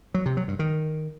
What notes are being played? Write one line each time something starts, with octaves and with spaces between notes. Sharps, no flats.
F#3
C3
F#3
G2
D#3